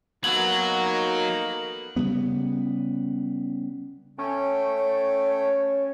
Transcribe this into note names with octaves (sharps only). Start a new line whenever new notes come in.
F#3 A#3 B3 D#4 F#4 A4 F#7
C#3 G3 B3
A3 C#4 A4 G5
C#5